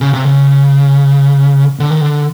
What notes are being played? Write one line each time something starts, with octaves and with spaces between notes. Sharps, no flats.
C#3
C3
C#3
D3
D#3
D3